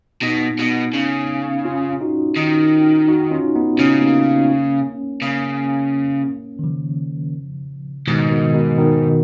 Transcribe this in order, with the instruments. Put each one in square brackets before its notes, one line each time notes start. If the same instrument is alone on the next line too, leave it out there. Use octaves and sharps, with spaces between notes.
[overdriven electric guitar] B2 [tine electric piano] B3 D#4
[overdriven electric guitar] B2
C#3
[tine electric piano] C#4 F4
D#4 F#4
[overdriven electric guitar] D#3
[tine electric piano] D#4 F#4
C#4 F4
B3 D#4
[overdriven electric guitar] C#3 [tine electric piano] C#4
[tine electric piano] D#4
A#3 C#4
[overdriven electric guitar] C#3 [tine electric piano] A#3 C#4
[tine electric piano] D#3
C#3 F3
[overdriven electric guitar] G#2 [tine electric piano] B2 D#3
[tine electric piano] B2 D#3
B2 D#3
B2 D#3